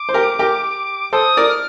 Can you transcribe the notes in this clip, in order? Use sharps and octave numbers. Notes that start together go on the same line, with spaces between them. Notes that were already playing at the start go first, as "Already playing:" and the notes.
Already playing: D6
C5
G4 A#4
G4 A#4
A4 C5 D#6
A#4 D5
F6